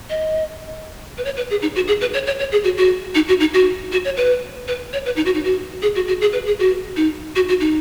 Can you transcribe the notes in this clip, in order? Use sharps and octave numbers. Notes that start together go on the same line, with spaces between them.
D#5
B4
C#5
B4
G#4
D#4
F#4
G#4
B4
C#5
C#5
C#5
G#4
F#4
F#4
D#4
F#4
D#4
F#4
F#4
C#5
B4
B4
C#5
B4
D#4
F#4
D#4
F#4
G#4
F#4
F#4
G#4
B4
G#4
F#4
D#4
F#4
F#4
D#4